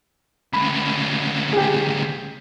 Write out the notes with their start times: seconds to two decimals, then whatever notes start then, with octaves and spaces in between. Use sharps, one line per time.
0.53 D2 C#3 B5
1.53 G4 G#4